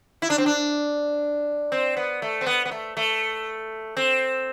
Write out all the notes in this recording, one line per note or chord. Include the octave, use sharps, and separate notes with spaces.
E4
D4
C4
D4
C4
B3
A3
C4
B3
B3
A3
A3
C4